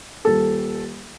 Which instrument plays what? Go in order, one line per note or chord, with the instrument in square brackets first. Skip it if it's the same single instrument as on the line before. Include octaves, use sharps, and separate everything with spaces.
[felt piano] D#1 A4